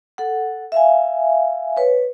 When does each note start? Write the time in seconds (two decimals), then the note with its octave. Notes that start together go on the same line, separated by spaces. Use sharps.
0.18 A4 F#5
0.72 E5 F5 G#5
1.77 B4 C#5